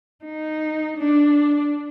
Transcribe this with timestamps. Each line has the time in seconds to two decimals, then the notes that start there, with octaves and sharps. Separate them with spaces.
0.25 D#4
0.98 D4